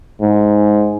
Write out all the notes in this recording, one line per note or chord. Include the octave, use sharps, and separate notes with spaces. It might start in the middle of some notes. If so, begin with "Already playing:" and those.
G#2